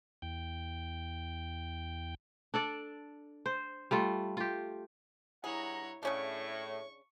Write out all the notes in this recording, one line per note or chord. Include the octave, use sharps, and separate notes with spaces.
E2 G5
D4 A4 D5
C5
G3 A3 F4
F4 G4
G2 E4 G#4 C#5 F#5 A#5
A2 C#3 C#4 D4 E4 G#4 C#5 C#6